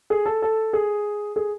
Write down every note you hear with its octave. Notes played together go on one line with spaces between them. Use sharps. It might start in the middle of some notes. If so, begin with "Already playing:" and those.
G#4
A4
A4
G#4
G#4